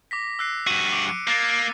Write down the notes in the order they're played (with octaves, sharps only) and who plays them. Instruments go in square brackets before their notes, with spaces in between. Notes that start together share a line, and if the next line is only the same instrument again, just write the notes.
[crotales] D6 A#6 B6
E6 F#6 C7
[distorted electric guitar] G2 F#4 [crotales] D#7
[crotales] D6 D7
C#7
[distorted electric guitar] A#3 [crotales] D6 A6 C7